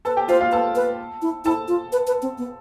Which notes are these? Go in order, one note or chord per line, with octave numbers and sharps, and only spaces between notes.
A4 B4 A5
G4 G5
F4 C5 F5
F4 F5
A4 B4 A5
B4
E4
E4 A4 A5
F4
B4
B4
C4
B3